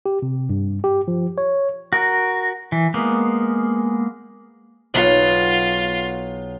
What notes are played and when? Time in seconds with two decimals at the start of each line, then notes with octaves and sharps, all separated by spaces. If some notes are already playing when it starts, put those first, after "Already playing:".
0.06 G4
0.22 C3
0.50 G2
0.84 G4
1.08 F3
1.38 C#5
1.93 F#4 A#4
2.72 E3
2.94 G#3 A#3 B3
4.94 B1 B3 F4